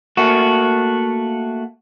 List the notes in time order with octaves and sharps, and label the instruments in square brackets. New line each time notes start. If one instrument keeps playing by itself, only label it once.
[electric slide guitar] A3 A#3 F#4